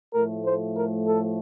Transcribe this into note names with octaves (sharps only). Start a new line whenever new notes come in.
A2 F3 A3 A#4
C5
A#4
A4